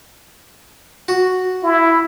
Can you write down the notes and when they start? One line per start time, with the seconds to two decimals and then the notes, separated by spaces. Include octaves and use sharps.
1.08 F#4
1.64 E4